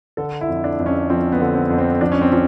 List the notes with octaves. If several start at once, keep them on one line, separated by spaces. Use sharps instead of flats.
D3 A4
E4
F2
D4
F2
C#4
F3 C4
B3
D3
C4
F2
C4
F3 D4
C#4
C4
F3 C#4